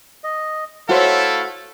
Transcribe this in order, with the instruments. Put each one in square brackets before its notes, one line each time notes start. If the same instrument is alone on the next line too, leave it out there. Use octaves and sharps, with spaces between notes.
[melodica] D#5
[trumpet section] A3 E4 A4 [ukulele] F#4 C5 C#5 [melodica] F5